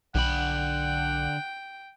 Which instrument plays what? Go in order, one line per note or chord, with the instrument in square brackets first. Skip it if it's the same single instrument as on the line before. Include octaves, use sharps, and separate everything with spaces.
[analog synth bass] B1 [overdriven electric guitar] D3 B5 [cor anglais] F#5 [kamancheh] G5